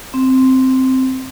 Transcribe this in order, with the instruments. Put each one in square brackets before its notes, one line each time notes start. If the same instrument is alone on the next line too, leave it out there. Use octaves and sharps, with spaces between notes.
[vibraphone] C4